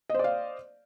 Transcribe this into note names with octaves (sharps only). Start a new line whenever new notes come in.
C5 D5 D#5 F5